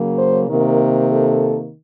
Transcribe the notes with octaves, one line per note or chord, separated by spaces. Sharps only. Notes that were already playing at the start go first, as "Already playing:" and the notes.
Already playing: C#3 F#3 A#3
C5
C3 D#3 A#3 A#4
A4